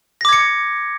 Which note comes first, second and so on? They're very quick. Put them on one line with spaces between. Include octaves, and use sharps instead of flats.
A#6 D6 G#6 C#7